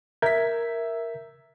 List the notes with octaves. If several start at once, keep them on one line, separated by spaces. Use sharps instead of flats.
A#4 E5 G6 G#6 B6